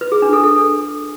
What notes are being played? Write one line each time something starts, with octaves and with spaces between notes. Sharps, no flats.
B4
G#4
D4
A4
A4